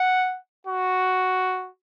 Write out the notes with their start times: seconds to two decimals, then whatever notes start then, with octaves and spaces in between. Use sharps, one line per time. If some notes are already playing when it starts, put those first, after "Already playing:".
Already playing: F#5
0.67 F#4